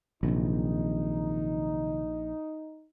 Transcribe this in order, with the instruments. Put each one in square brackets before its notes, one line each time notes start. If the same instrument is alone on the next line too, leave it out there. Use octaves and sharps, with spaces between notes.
[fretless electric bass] A#1 [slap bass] C3 D#3 F#3 [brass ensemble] D#4